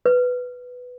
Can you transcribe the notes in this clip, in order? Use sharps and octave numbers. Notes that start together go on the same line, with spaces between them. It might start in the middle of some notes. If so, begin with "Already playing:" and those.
B4